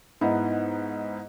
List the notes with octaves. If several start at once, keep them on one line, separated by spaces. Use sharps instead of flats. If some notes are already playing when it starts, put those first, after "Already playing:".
G#2 B3 D#4 E4